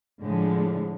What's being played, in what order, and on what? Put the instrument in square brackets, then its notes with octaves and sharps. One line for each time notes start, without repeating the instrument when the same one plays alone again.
[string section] A2 D3 F3 G#3